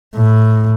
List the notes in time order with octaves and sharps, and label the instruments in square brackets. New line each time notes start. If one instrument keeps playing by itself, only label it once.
[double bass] A2